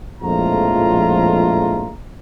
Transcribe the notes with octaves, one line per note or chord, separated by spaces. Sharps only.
A#1 F2 A2 G#3 F4 A#5